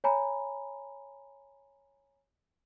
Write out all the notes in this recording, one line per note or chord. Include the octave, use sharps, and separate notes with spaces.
C#5 G#5 A#5 B5